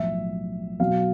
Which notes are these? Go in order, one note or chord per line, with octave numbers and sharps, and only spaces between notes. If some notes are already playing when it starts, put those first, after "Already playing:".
Already playing: B1 A2 F3 E5
B1 B2 F#3 F5